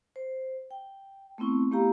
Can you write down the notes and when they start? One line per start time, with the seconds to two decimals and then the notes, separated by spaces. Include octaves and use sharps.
0.16 C5
0.71 G5
1.38 A3 B3 C4 E4 C#6
1.71 A3 B3 E4 G4 F5 A#5